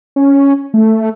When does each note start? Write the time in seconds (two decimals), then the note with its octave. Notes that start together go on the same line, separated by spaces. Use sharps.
0.16 C#4
0.74 A3